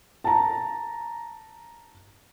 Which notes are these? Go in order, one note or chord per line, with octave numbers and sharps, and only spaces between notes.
A5 A#5